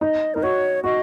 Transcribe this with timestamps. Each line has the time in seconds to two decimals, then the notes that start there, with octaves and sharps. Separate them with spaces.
0.01 D#4 D#5
0.34 D#4 A#4
0.43 F#4 C#5
0.84 F#4 D#5